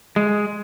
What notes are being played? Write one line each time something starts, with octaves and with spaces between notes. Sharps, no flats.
G#3